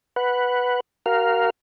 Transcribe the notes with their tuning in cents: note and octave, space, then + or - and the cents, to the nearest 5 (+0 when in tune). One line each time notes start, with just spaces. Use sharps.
B4 +0 F#5 +0
F#4 +35 A#4 +0 F5 +0